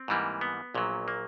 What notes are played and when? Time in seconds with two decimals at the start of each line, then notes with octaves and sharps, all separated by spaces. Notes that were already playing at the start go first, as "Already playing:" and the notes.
Already playing: C4
0.08 G#2 E3 G3 A#3
0.41 B3
0.75 A#1 A#2 F#3
1.08 A#3